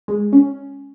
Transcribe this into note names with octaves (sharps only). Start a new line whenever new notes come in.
G#3
C#4